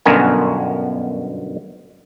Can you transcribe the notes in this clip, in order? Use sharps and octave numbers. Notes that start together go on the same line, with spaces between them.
G1 F#2 B2 D3 A#4 G#5